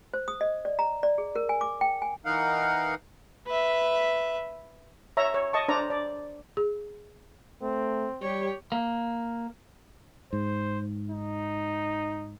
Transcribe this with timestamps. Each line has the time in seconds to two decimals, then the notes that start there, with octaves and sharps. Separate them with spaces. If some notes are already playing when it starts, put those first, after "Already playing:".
0.14 C5
0.28 D#6
0.41 D#5
0.65 D5
0.79 A#5
1.03 D5
1.18 G#4
1.36 A#4
1.49 G#5
1.61 D6
1.81 G5
2.02 G#5
2.25 E3 D#4 A#4 F5 F#5
3.47 B4 E5
5.17 C#5 E5 A#5
5.34 C#5
5.53 D#5 A5 C#6
5.68 D4 C5 D5 A#5
5.90 D5
6.57 G#4
7.62 A3 C4
8.22 G3 G4 C#5
8.72 A#3
10.33 G#2 C5
11.10 D#4